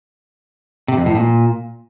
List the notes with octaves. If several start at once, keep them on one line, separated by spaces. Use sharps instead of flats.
C3
F2
A2
A#2